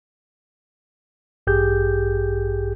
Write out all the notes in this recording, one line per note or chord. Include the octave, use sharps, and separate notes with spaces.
A1 G2 G4 G#4 G6